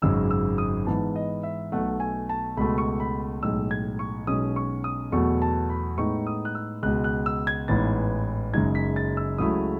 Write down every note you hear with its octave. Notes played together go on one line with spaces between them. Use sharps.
G#1 F#2 C#3 G#3 E6
E6
D#6
G#2 E3 B3 A5
D#5
E5
B1 B2 A3 F#5
G#5
A5
C#2 B2 A3 B5
C#6
B5
B1 A2 G#3 E6
G#6
C#6
B1 B2 G#3 C#4 D#6
C#6
D#6
E2 B2 F#3 A3 C#6
A5
B5
A2 G#3 B3 D#4 C#6
D#6
F#6
E6
C#2 B2 G#3 F#6
F#6
E6
G#6
A1 G#2 E3 B3 A6
F#1 F#2 C#3 G#3 D#4 G#6
B6
A6
E6
C#2 C#3 F#3 A3 E4 D#6